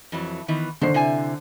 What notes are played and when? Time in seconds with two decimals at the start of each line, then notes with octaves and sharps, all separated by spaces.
0.12 F2 E3 F#3
0.48 D#3 E3 B3
0.81 D3 D#3 C5 C7
0.94 C3 E4 G#5